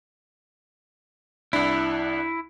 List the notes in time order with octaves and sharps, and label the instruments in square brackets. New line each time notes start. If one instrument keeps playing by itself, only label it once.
[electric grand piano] C2 D4 [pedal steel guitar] E4